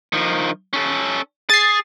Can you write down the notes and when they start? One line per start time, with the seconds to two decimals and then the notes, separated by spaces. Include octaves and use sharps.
0.13 D#3 F3
0.73 C#4 A4
1.50 G#4 A6 C7